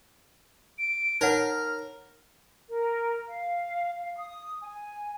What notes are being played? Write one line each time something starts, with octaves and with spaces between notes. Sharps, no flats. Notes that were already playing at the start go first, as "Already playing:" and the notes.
D7
D#4 A#4 C#5 F#5 F6
A#4
F5
F5
D#6
G#5